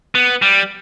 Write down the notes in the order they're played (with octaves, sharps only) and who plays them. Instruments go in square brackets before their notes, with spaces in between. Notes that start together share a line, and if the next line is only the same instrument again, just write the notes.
[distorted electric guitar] B3
G3